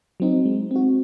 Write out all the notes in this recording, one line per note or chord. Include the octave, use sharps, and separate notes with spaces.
F#3 C4 D#4
G#3
C4 F#4